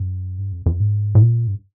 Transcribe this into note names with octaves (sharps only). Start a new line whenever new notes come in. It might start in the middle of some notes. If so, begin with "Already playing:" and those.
Already playing: F#2
G2
F2
F2
G#2
A2
A#2
G2